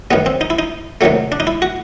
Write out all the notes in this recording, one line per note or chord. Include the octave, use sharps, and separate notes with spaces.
F#2 D#3 G3 B3
C4
D#4
E4
D#4
C2 C3 D#3 F#3 A3
D4
D#4
E4
F#4